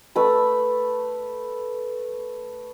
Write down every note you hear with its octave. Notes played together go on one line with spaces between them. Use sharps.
A3 B4 B5